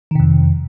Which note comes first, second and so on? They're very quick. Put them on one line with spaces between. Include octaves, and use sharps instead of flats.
D#3 C3 F2